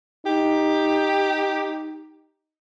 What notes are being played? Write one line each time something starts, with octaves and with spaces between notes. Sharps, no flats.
D#4 G4